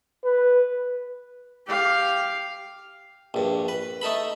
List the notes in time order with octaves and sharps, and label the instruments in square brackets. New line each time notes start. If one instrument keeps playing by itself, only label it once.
[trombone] B4
[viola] G4 F5
[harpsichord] A#1 G2
B4
A3 D#4 A4 B5